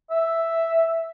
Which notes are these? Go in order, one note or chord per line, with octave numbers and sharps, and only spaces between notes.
E5